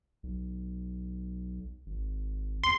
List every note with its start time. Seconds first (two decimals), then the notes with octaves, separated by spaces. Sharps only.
0.23 B1
1.86 G#1
2.64 E2 C6